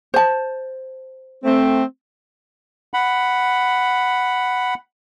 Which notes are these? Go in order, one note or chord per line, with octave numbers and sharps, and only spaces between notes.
C5 A5
A3 C4
F#5 B5